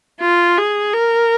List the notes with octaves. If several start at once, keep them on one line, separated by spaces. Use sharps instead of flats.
F4
G#4
A#4